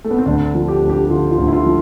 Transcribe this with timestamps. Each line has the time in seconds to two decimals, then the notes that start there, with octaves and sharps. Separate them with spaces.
0.04 A3
0.11 B3
0.18 C4
0.26 D2 D4
0.55 F3
0.68 G4
0.82 D2
0.90 G4
1.05 G4
1.10 D3 F4
1.31 F4
1.38 D2
1.48 E4
1.52 F4
1.66 F3